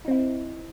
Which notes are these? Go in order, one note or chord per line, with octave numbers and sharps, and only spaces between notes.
C4 D#4 E4